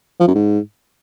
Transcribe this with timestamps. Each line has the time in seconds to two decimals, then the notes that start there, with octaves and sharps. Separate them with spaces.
0.20 F3
0.27 F#2
0.34 G#2